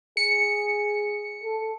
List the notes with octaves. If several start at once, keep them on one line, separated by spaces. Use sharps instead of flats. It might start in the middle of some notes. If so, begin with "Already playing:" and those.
G#4 C#7
A4